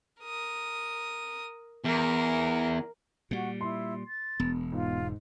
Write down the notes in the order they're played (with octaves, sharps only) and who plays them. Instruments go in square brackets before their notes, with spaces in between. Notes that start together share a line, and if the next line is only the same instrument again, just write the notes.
[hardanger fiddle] A#4 D#6
[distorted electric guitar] E2 [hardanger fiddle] A#4
[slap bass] A#2 G3 [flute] F#4
[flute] E4 [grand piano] C6
[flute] A6
[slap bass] E1 [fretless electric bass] B3
[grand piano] G#2 [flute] F4